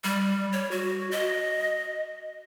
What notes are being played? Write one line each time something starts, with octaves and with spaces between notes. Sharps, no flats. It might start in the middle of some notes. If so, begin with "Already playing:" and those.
G3
C#5
F#4
D#5